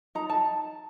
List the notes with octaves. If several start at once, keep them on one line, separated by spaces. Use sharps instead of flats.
D#4 A#5
A5